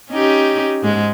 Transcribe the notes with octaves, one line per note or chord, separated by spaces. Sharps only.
C#4 D#4 G4
G#2 G#3